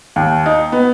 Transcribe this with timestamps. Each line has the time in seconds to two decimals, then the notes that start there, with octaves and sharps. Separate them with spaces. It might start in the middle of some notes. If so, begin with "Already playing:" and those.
0.16 D#2
0.46 D#4
0.72 B3